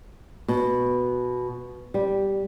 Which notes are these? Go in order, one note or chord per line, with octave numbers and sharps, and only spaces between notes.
B2
G3